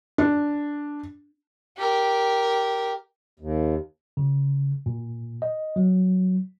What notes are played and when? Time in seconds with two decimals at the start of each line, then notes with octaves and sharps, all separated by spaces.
0.18 D4
1.77 G4 A#4
3.40 D#2
4.17 C#3
4.86 A#2
5.42 D#5
5.76 F#3